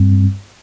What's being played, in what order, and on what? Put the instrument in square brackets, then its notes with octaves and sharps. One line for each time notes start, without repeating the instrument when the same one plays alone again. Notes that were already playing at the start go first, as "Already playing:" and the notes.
Already playing: [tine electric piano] G2 G3 C4